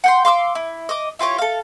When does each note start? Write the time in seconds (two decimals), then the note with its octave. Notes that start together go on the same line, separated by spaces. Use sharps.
0.04 F#5 G5 C6
0.25 F5 C6 D6 E6
0.55 E4
0.89 D#5 D6
1.19 E4 F4 G4 C#5
1.38 A4 F5